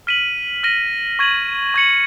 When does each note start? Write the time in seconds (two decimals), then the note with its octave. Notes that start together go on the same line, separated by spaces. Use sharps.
0.07 F6 B6 D#7 F#7
0.63 F6 A#6 D#7
1.19 C#6 G#6 D#7 F#7
1.74 C#6 G#6 C#7 F#7